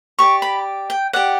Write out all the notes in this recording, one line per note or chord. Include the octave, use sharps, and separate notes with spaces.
G4 D5 C#6
B5
G5
G4 D5 F#5